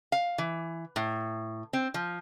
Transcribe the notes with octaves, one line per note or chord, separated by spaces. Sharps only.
F5
E3
A2
C4
F3